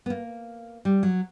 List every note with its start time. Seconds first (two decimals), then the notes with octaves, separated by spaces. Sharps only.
0.06 B3
0.10 A#3
0.85 G3
1.03 F#3